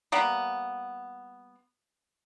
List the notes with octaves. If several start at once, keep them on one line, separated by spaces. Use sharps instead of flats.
G3 A#3 B3